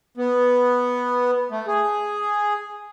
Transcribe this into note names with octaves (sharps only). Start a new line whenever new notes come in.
B3
A3
G#4